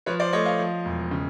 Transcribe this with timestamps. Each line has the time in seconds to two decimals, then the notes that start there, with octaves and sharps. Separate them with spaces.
0.06 F3 B4 C#5
0.20 C5 D5
0.33 A3 C#5 D#5
0.45 D#5 F5
0.59 F3
0.85 E1
1.11 C#3